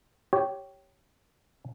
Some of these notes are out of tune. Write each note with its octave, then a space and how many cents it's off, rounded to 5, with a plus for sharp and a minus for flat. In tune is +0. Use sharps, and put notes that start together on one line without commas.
G4 -10 C#5 +0